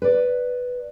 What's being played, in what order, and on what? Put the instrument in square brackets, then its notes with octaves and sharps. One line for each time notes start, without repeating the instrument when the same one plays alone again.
[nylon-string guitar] B4 D5